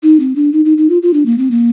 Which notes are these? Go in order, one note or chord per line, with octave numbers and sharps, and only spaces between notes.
D#4
C4
D4
D#4
D#4
D#4
F4
F4
D4
A#3
C4
A#3